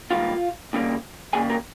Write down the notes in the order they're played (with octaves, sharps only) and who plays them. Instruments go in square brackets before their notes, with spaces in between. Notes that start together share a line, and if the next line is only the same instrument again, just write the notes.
[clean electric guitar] G#2 D#3 G3 A#3 F4 F5
D#2 C#3 G3 A#3
D#2 C#3 G3 A#3 G#4 G#5
A#3 A#4